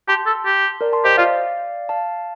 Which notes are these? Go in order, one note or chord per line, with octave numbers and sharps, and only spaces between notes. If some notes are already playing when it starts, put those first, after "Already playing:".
G4 A5 C6
A4
G4
A#4 D5
A5 C6
G4 C5 D#5
F4 D5 F5
F5 A5